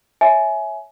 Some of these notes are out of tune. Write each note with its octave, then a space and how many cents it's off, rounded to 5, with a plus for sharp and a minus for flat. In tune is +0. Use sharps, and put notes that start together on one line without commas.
C#5 +0 E5 +0 G#5 +20